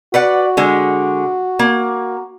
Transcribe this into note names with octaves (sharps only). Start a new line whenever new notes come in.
F#4 B4 D5 F#5
D3 G#3
A#3